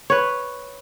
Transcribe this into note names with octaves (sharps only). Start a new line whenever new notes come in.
B4 C#5